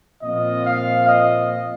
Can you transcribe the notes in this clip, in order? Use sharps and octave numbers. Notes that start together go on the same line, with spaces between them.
A#2 F3 C4 F4 D#5
F5
D#5